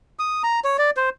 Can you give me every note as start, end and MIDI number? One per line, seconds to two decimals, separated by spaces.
0.19 0.42 87
0.44 0.60 82
0.64 0.77 73
0.78 0.90 74
0.97 1.10 72